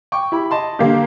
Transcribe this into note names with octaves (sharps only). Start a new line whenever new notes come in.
G5 C#6 D6
E4 G4 B5
D#5 A5 C6
D3 A#3 G4